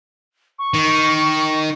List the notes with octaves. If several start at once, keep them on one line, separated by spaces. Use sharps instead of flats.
C#6
D#3